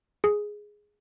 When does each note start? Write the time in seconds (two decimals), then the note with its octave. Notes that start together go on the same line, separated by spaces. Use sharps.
0.24 G#4